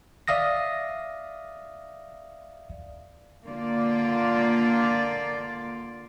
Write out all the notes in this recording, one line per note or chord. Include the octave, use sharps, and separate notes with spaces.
D5 E5 F5 D#6 A#6
D3 A#3 F4 D5